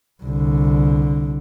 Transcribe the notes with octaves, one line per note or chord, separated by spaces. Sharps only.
C2 D3